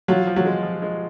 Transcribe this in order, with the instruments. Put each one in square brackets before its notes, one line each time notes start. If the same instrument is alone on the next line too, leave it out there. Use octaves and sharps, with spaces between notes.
[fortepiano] F#3 [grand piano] F4
[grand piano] F3
[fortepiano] F#3
[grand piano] G#3
F3
G#3